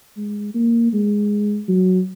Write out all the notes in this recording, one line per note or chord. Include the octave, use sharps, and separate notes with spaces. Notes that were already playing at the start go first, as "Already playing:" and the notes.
G#3
A#3
G#3
F#3